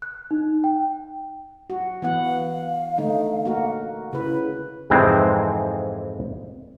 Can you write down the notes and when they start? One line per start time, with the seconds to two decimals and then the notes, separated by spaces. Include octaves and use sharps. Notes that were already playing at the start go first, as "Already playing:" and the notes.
0.02 F#6
0.31 D#4
0.64 G5
1.70 F#4
2.02 E3 B3 F#5
2.25 F5
2.98 D3 A3 D#4
3.45 A#3 F#4 A#4
4.13 C#3 E4 B4
4.90 F2 G#2 C3 E3 G#3 C4